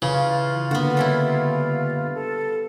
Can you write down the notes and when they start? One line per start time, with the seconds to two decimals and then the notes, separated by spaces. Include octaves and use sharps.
0.02 C#3 E3 F4
0.71 D3 A#3 B3 F#4
0.97 G3 C#4 E4
2.14 A4